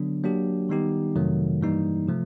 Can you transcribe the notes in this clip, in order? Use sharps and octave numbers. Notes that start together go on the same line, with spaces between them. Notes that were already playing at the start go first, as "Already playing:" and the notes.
Already playing: D3 F#3 B3 D4
F#3 A#3 D4 G4
D#3 G3 B3 D#4 G4
F2 C3 D#3 F#3 A3
G2 E3 G3 A#3 D#4
C3 F3 A3